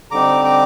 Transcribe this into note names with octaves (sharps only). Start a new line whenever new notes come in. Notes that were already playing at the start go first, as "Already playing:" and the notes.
D3 G3 C4 D#4 A#5 D6
A#5 D6